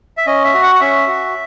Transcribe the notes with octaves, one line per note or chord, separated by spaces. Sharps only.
E5
C#4 D#5
E5
F#4
F#5
F#5
C#4 E5
F#4